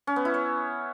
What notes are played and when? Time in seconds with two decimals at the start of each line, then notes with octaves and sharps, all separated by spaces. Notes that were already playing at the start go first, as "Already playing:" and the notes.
0.07 C#4
0.16 B3
0.25 E4
0.34 C#5